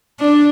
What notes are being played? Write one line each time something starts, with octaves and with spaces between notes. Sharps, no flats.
D4